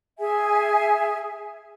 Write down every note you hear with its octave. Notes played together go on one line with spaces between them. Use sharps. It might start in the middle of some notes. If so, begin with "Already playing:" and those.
G#4 E5 G#5